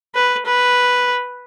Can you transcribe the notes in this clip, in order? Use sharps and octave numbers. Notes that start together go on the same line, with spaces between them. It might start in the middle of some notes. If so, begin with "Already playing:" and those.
B4
B4